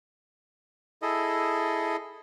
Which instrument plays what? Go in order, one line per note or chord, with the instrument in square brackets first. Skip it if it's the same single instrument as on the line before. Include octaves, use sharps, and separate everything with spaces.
[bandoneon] E4 G#4 A4 D#5